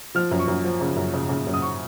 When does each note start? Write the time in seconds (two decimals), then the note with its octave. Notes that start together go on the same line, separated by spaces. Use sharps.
0.15 F3 F6
0.31 F#2
0.39 C#6
0.48 F#2
0.64 F3
0.81 C#3
0.96 F#2
1.14 C#3
1.29 C#3
1.47 F#2
1.54 D#6
1.62 C#6